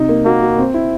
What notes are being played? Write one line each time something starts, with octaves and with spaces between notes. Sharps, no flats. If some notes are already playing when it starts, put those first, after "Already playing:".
Already playing: C3 D#4
A#3
A#3 F#4
F#4
C4
E4